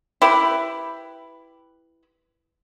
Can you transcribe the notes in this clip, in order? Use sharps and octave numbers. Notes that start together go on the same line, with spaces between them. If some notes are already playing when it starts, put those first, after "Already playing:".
E4 G4 B4